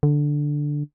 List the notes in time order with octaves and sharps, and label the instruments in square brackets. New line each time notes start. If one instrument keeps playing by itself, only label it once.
[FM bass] D3